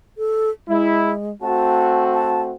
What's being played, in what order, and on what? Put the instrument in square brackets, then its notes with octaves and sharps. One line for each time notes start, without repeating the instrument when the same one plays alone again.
[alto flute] A4
[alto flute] G#3 [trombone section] E4
[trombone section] A3 C4 F#4 [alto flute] A5
[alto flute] A5